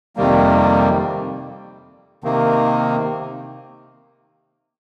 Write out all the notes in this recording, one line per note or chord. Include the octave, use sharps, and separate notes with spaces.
F2 C3 D#3 G3 A#3
C3 D#3 A#3